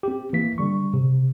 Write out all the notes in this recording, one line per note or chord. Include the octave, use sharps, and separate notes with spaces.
C4 G4
E3 A#3 B6
D3 G3 C#6
C3